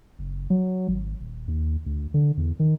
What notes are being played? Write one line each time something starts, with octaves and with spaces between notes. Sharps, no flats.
F#1
F#3
G#1
D#1
D#2
D2
D3
E2
D#3